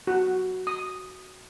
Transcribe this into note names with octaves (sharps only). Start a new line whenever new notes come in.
F#4
D#6